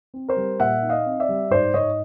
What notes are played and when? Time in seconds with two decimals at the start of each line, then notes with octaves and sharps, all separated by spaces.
0.14 C4
0.29 A#4 C5
0.37 G3
0.60 A#2 E5 F#5
0.82 D#4
0.89 D#5 F5
1.06 C4
1.20 D5 E5
1.29 G3
1.51 G#2 C5 D5
1.74 G#2 C#5 D#5